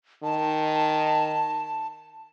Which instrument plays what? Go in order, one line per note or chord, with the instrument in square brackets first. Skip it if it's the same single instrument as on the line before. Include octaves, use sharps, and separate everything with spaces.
[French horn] D#3 [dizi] A5